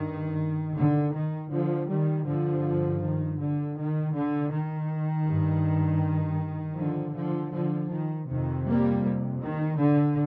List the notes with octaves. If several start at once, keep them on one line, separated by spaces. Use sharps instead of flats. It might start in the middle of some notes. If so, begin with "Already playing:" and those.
Already playing: G2 D#3
D3
D#3
D3 F3
D#3 G3
G2 D3 F3
D#3
D3
D#3
D3
D#3
G2
D3 F3
D3 F3
D3 F3
D#3
F2 C3 D#3
G3 A#3
D#3
D3